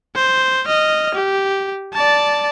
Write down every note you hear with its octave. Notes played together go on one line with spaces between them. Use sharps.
C5
D#5 F6
G4
D5 A5